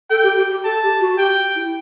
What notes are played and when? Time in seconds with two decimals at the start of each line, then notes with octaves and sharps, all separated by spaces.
0.10 A4 G5
0.23 G4
0.37 G4
0.51 G4
0.64 A4 A5
0.83 G4
1.01 F#4
1.18 G4 G5
1.55 E4